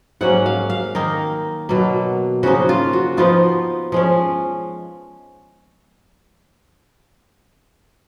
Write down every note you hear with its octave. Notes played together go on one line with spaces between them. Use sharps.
G#2 F#3 A#3 C#4 F#5
F5
F5
D#3 A#3 D#4 A#4
B2 F#3 A#3
C#3 F3 A#3 D#4 F#4
F4
F#4
F3 B3 D#4 F4
F3 G#3 C#4